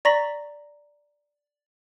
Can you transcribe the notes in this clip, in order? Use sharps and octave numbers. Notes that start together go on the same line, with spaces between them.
D5 A#5 C#6 A#6 B6 F#7